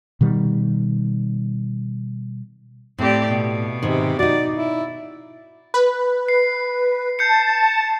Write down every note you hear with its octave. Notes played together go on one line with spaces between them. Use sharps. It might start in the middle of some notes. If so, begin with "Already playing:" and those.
B2 D#3 G3
A2 C4 G4 D5
B2
G#2 C3 D#3
D#4 F#4 D5
E4
B4
C7
A5 G6 C7 C#7